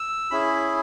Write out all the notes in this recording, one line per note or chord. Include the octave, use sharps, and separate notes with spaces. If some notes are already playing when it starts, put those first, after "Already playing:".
Already playing: E6
C#4 E4 G#4 B5